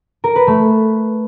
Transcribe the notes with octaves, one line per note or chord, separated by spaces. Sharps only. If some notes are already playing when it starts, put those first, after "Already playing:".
A#4
B4
A3